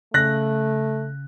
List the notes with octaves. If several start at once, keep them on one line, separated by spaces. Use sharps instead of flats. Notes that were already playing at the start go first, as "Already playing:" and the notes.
C#3 A3 F#6 A#6